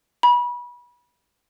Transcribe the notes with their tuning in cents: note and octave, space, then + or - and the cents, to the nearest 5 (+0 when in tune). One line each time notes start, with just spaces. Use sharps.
B5 -30